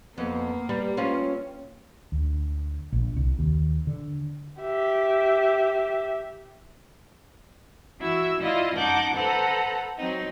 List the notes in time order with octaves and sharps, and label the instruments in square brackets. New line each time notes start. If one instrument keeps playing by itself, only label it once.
[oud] F2 [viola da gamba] A#3 [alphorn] B3
[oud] G3 [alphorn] B4
[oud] C4 C#4 F4
[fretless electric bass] D2
A#1
C2
D#2
D3
[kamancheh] G4 E5
[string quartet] E3 E4 F#4 E5 E6
E4 F4 D5 D#5 F5
F#2 D#4 F#5 A5 D6 G6
A4 B4 C5 F#5 A#5
F#3 C4 D#4